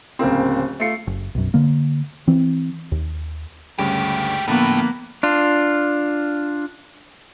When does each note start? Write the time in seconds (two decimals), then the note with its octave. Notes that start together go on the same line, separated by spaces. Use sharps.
0.19 D1 C#3 A#3 C4
0.80 A3 F4 C7 C#7
1.07 F#1
1.35 B1 F#2
1.54 D3 A#3
2.27 E3 C4
2.92 D#2
3.79 D2 G2 C#3 G#3 G4
4.48 A2 D3 F3 A#3 B3 B5
5.23 D4 F4